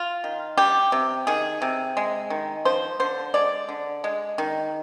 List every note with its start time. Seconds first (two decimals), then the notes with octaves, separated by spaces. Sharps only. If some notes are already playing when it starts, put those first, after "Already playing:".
Already playing: F4
0.24 D#3
0.58 G3 G4
0.92 C3
1.27 D#3 G#4
1.62 C3
1.97 G#3
2.30 D#3
2.65 F3 C5
3.00 D3 C5
3.34 G#3 D5
3.69 D3
4.04 G#3
4.38 D#3